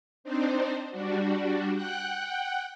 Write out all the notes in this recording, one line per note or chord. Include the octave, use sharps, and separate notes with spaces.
C4 D4 D#4 C5
G3 D4 F#4
F#5 G5 F#6